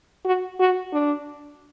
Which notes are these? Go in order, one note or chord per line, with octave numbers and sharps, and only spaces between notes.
F#4
F#4
D4